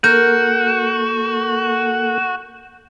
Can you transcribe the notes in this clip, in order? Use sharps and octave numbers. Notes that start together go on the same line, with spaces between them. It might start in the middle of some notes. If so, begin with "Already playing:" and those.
A#3 F#4 A4 A#4 G6